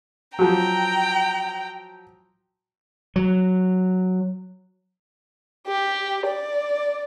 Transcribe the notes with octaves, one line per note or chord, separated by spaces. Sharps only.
F3 F#3 G5 A#5
F#3
G4
D5